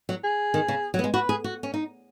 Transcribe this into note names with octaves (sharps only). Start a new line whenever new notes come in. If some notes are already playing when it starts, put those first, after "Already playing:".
F#3
G#4
D#3
C#3
F#3
B3
G#3
F#4 B4
G#4
F#4
C#4
D#4